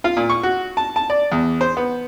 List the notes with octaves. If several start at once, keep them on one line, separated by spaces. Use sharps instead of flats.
F4
A#2
C#6
F#4
A5
A5
D5
E2
C5
B3